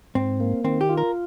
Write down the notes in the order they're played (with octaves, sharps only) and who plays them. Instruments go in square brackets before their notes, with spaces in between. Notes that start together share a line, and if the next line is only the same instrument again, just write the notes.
[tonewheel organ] G#2 [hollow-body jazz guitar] C4
[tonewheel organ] A#3
[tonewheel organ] D#3 [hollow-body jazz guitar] C4
[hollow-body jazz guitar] G4
[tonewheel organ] F4
[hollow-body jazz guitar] A#4